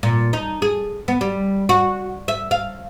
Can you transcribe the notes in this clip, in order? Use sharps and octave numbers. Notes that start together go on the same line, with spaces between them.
A#2
D#4
G#4
B3
G3
F#4
E5
F5